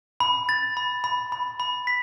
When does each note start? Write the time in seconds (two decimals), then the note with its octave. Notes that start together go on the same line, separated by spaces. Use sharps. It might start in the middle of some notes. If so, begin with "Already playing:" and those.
0.20 B5
0.49 A6
0.77 B5
1.04 B5
1.32 B5
1.60 B5
1.87 B6